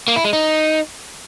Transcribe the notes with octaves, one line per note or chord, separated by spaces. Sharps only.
A#3
E4
G#3
D#4